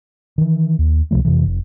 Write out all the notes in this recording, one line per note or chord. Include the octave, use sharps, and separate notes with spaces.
D#3 E3
D#2
C#2 C3 F3 A3
F2 C3 E3
F1